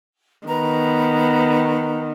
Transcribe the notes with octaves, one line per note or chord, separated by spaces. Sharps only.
D#3 B3 B4 A#5